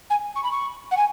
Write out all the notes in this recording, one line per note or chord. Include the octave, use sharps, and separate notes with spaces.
G#5
C#6
B5
C#6
F#5
G#5